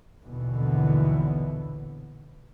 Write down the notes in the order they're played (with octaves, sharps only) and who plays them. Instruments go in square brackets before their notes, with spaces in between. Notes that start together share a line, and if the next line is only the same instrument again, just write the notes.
[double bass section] A#1 D#2 B2 D3 E3 B3